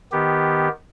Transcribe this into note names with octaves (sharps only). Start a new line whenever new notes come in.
D#3 B3 G4